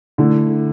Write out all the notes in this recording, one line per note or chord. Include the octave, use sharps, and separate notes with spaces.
D3 A3 E4